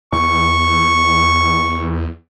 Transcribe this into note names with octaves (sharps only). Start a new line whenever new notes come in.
E2 C#6